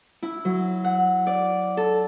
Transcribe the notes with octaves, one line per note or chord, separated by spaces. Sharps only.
E4
F#3
F#5
D5
A4